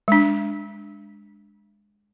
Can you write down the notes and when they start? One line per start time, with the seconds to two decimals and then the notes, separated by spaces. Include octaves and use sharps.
0.08 G#3 D4